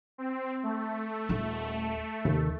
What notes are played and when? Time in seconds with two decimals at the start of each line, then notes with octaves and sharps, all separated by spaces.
0.18 C4
0.63 A3
1.29 D#1 D#4
2.25 D#2 C3